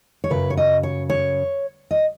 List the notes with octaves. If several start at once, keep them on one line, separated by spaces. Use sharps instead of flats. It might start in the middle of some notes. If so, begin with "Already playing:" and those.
C#5
F#2 C#3 F#3 B4
C#5
D#5
C#5
C#5
D#5